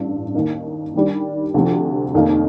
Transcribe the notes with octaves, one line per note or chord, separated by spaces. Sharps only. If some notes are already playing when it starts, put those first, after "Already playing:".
Already playing: A1 G2
D#2 D#3 A#3 D#4
D#2 D#3 G3 D4
D2 C3 F3
F1 D#2 D#3 A#3 D#4